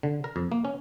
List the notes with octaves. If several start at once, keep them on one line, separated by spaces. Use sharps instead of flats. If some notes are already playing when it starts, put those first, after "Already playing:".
D3
A#4
F2
A#3
C#4